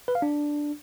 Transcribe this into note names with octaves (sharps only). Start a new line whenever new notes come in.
B4
F5
D4